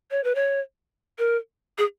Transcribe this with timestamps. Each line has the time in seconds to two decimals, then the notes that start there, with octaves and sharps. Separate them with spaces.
0.11 C#5
0.24 B4
0.35 C#5
1.18 A#4
1.78 G#4